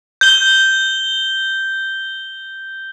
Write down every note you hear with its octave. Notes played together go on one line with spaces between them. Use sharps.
G6 G7